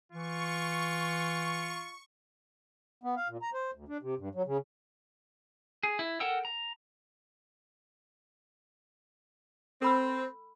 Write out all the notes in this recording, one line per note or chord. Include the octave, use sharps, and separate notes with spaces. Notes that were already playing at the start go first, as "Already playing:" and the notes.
E3 F4 C#6
B3
F5
A#2
A#5
C5
D2
D4
C3
G2
F#3
C#3
G#4
E4
A4 A#4 F#5 G5 E6
A#5
C4 A4 B5 E6